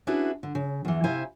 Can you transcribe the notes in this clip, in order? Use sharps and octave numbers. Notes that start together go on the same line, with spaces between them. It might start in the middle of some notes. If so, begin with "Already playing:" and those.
C#4 D4 E4 F#4 G#4 B4
D3
C#3
E2 E3
C3 E4 C5 F5 G#5